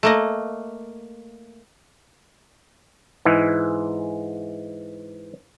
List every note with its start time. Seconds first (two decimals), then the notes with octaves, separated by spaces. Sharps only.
0.03 A3 A#3 D#5
3.25 G#2 E3 G#3